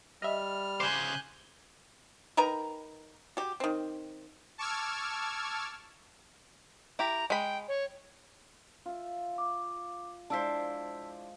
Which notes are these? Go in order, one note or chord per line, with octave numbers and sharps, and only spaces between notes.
G3 D#5 E5 F6
C#3 C5 G#5 C6 D6 F#6 G6
D#3 A#4 B4 A#5
F#4 G4
D#3 C4
A5 C#6 D6 E6 F6 G#6
E4 G4 A#5
G#3 G5 B5
C#5
F4 E5
F5 D6
F3 G#3 D4 E4 C5 A5 E6 B6